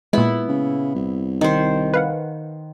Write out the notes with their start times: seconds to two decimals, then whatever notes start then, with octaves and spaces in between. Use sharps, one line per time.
0.13 A#2 G#3 B3 E4
0.49 C#3
0.95 C2
1.41 D#3 D#4 C5
1.94 B4 F5 F#5